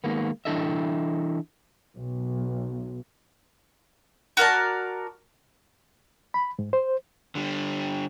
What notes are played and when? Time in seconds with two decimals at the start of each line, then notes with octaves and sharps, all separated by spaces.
0.04 D#3 G#3 A#3 B3
0.45 E3 D4 E4 A4 D#5 E5
1.95 B1
4.37 F#4 A#4 D5 A5
6.34 B5
6.59 G#2
6.73 C5
7.35 D3 G3